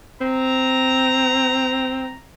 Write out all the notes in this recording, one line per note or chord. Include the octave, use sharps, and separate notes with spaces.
C4 A#5